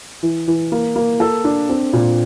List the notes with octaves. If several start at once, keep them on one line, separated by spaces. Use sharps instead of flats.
E3
E3
A#3
A#3
A4
D4
C4
A#2